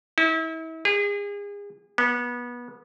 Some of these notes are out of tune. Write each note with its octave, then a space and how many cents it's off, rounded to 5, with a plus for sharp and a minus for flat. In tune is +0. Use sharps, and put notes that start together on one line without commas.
E4 -35
G#4 -35
B3 -25